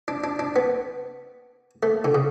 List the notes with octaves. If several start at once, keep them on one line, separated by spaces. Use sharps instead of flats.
D4
D4
D4
B3
A3
D3
C#3